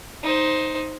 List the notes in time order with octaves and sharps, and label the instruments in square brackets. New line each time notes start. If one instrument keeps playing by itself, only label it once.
[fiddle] D#4 C5